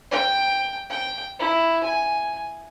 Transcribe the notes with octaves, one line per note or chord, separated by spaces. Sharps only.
G5
G5
E4
G#5